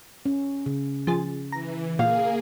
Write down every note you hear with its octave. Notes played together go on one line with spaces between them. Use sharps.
C#4
C#3
F3 G#4 A6
E3 A#5
A#2 A#3 G#4 F5